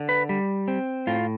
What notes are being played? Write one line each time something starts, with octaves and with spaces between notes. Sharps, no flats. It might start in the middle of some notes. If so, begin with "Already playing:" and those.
Already playing: D3
B4
G3
C4
A2 F4